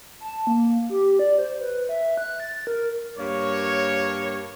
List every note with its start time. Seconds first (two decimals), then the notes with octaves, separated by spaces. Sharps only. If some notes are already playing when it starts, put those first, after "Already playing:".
0.20 A5
0.47 A#3
0.90 G4
1.19 D5
1.38 C5
1.61 B4
1.89 E5
2.17 F#6
2.40 A6
2.67 A#4
3.18 G2 A#3 C#5